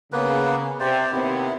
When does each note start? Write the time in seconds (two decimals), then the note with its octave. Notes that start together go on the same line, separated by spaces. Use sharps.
0.13 C#3 A#3 B3 B4
0.80 C3 C5 D5
1.12 D#2 C3 B3 E4